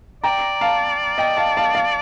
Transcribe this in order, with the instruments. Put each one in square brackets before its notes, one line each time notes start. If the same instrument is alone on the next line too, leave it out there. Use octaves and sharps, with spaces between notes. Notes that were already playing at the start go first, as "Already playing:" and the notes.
[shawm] D5 [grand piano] G5 A#5
[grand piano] F5 A5
D#5 G5
F5 A5
F5 A5
F5 A5